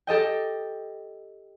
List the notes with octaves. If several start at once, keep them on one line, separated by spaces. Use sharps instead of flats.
G4 A4 D#5 G5